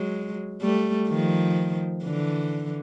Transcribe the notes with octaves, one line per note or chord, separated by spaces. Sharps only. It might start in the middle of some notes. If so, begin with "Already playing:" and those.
Already playing: F#3 G#3
G3 A3
D#3 F3
D3 E3